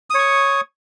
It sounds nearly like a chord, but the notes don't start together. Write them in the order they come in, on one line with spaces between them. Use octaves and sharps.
D#6 C#5 C#6